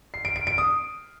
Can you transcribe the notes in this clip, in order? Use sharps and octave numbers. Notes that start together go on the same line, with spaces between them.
C7
D7
D7
D7
D#6